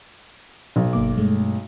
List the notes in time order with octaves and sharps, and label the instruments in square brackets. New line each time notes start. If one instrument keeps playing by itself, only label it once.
[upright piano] B1
[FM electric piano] G1 A#3 D6
G2 G#3 A3